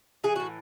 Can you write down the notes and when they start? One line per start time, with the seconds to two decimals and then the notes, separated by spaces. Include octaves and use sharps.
0.24 E3 G#4
0.36 A2 F#4